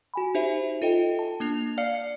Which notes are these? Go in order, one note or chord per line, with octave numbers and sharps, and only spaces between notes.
F#4 G#5 B5
D#4 G4 C5 E5
F4 A4 D#5 G5
A5
A#3 D4 F7
D5 F5 F6 C7 C#7